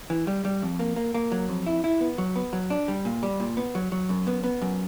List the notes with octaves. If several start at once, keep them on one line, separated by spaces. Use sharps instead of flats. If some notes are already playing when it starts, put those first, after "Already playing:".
E3
G3
G3
F2
A#3
A#3
A#3
F#3
F2
E4
E4
B3
F#3
B3
F#3
D4
G3
A#2
G3
A#2
B3
F#3
F#3
F#2
B3
B3
F#2